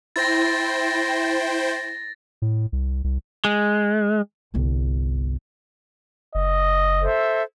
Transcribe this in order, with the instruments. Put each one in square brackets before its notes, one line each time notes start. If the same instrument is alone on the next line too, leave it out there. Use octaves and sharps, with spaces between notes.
[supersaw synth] E4 C5 G5 [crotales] A6 A#6
[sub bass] A2
C2
C2
[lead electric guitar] G#3
[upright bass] G1 C2
[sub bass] F#1 [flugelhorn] D#5
[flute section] A4 C5 E5